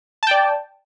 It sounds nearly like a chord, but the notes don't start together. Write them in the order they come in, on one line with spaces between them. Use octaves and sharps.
A5 G5 D5